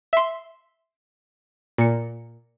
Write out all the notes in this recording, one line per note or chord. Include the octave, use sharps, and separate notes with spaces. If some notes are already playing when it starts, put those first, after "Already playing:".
E5 C6
A#2 C#7